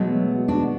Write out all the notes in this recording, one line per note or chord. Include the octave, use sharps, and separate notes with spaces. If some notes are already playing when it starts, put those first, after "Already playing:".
Already playing: B2 F#3 G#3 A3 B3
D4 F#4